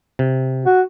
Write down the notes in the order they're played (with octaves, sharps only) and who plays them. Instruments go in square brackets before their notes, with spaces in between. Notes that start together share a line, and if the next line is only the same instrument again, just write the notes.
[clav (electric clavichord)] C3
[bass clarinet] F#4